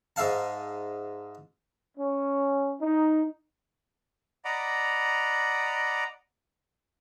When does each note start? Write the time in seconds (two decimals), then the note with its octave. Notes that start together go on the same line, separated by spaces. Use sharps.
0.16 G#2 E5 F5 A5
1.96 C#4
2.80 D#4
4.45 D5 D#5 F#5 A#5 B5 D6